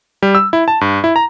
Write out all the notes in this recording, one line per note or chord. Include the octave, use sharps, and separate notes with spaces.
G3
E6
E4
A5
G2
E4
A#5